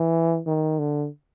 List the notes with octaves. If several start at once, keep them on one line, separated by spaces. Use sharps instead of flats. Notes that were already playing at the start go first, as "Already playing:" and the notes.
Already playing: E3
D#3
D3